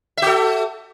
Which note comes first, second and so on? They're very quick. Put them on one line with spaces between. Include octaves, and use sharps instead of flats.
E5 F#4 A4